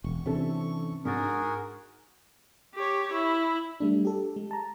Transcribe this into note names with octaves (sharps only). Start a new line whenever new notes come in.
E1 C#6
C3 E3 C#4 D4 A4
G#2 D4 F#4 G#4 A#4 A6
G4 C#5
E4
G3 A3 D4
G4 A4
G#3
A5 A#5